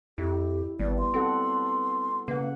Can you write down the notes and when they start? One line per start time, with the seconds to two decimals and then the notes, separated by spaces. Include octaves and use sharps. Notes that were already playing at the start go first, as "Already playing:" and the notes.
0.18 F2 E4 G4
0.79 G#1 G3 B3 D5
0.98 C6
1.14 C4 F#4 A4 F#5
2.28 C#3 A#3 B4 F#5